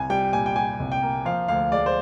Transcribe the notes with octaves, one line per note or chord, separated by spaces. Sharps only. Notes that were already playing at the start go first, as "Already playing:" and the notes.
Already playing: C2 G#5
G3 G5
A#2 G#5
G5
G3 G#5
C2
G5
A#3
F3 F5
D2 F5
G#3 D5
C5